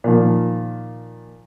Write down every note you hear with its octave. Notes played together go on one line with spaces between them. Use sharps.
A#2 D#3 F3